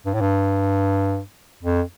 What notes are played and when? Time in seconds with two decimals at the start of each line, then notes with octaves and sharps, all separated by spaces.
0.06 G2
0.14 A2
0.21 G2
1.63 F2